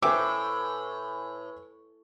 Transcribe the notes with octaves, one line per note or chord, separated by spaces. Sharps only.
A2 B4 C5 E5 G5 G#5 D6 E6